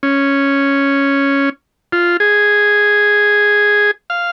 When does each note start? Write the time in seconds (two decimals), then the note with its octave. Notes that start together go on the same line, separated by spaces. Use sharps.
0.03 C#4
1.92 F4
2.20 G#4
4.10 F5